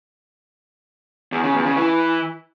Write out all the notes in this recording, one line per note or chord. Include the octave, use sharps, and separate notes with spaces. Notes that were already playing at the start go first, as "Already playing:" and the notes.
E2
C#3
E2
C#3
E3